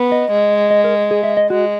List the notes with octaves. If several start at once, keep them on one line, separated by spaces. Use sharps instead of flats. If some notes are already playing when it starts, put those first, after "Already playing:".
Already playing: B3
D#5
G#3
D#5
A#4
G#4
E5
D#5
G#3 F#4